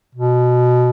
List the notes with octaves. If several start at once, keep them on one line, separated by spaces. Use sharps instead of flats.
B2